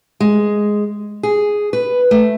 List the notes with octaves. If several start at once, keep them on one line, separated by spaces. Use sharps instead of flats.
G#3
G#4
B4
A3